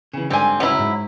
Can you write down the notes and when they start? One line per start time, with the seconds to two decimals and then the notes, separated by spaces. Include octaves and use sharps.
0.13 C#3 E3
0.30 G#2 D3 G3 C4 G#5
0.60 C#2 G#2 F#3 C#4 E4
0.79 G#2